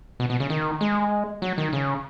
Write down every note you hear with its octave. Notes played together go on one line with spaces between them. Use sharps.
B2
B2
C#3
D#3
G#3
F#3
D#3
C#3